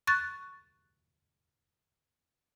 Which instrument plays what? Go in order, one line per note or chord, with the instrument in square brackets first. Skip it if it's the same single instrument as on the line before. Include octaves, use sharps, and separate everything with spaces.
[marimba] C#6 F#6 A6